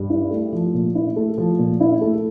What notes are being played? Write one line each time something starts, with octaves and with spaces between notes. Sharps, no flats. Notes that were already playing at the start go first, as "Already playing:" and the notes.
Already playing: G2
E4
A3
F3
A#2
E4
A3
F3
A#2
E4
A3